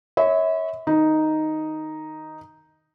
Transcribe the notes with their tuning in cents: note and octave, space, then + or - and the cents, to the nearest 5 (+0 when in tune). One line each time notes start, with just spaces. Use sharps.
C#5 +0 E5 -35 B5 +30
D#3 +0 D#4 +0